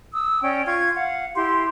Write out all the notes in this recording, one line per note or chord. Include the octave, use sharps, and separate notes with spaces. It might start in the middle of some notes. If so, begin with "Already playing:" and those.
D#6 E6
C#4 D5 G5
F4 C#6 G#6
F5 F#5
E4 G4 C6